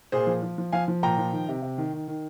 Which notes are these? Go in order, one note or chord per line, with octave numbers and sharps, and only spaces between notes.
A#2 G#4 C5
F3
F3
F3
F3 F5 G#5
F3
A#2 G5 A#5
F3
D#3
C3
C3
D#3
D#3
D#3